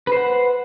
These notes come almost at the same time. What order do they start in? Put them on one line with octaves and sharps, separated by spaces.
B4 C5 F#5